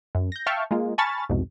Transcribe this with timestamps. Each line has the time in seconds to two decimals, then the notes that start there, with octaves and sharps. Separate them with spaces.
0.15 F#2
0.32 G6 A#6
0.46 E5 F5 G5 A5 C#6 F6
0.71 G#3 A#3 F4
0.98 G#5 A5 B5 C#6 F6 A6
1.29 C2 F2 G#2 B2